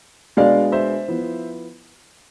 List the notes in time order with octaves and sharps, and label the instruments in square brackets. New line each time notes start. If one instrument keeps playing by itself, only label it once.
[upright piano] B2 G#3 B3 D4 D5 F5
C5 E5
F3 B3 E4